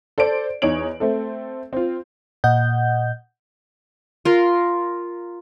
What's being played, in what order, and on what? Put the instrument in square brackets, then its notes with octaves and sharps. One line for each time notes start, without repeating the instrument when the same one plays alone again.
[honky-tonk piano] A4 C5 D5 D7
E2 D#4 C#5 D7 F#7
A3 C4 A4
C4 F4
[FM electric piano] A#2 D#5 F#5 G6
[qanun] F4 A#4 C6